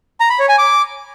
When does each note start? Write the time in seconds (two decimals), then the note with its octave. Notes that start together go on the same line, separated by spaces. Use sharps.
0.20 A#5
0.30 B5
0.39 C#5
0.49 G#5
0.58 D6